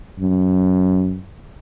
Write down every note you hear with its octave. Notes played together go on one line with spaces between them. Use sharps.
F#2